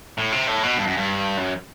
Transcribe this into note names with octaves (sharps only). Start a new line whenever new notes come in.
A2
C3
A2
B2
G2
F#2
G2
F#2